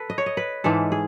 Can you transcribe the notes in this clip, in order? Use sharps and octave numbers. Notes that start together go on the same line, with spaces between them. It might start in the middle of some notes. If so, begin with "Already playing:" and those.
Already playing: A4 B4
D#5
C#5
D#5
B4
G#2 E3 G#3 A4
G#4